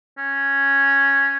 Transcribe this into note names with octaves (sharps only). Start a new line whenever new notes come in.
C#4